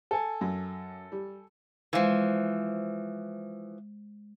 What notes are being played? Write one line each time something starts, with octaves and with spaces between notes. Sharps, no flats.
A4 G#5
F#2
G3
E3 F3 G#3 C5 F5